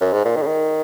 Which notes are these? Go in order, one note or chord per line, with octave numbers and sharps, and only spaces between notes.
F#2
G#2
A#2
D#3
C#3
D#3